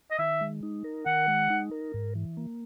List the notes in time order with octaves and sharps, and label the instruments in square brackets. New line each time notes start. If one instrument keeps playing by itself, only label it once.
[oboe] D#5
[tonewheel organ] D#3 [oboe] E5
[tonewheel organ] G#3
D#4
A#4
[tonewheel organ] D#3 [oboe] F#5
[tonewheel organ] G#3
D#4
A#4
G#2
E3
A#3